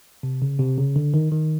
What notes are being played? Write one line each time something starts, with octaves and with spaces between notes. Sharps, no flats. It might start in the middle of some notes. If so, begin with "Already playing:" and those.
C3
C#3
C3
C#3
D3
D#3
D#3